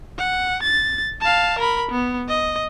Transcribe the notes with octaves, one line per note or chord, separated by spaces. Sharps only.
F#5
A6
F5 A5
A#4 B5
B3
D#5